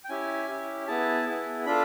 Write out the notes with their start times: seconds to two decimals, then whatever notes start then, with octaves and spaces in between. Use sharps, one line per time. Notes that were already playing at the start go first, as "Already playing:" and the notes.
0.04 G5
0.09 C#4 E4 G4 G#5
0.48 C#4 E4 G4
0.88 B3 E4 G#4 A5
1.26 B3 E4 G#4
1.66 D4 F4 A4 B5